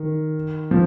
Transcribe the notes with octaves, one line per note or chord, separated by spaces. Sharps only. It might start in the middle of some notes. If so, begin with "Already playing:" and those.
Already playing: D#3
F3